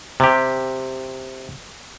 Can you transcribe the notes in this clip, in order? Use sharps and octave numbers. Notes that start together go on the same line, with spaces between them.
C3 G4